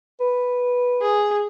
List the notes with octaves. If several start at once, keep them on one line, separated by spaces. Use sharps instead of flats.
B4
G#4